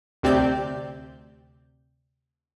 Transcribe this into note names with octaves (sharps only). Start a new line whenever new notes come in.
D2 C3 C4 G4 D5 G6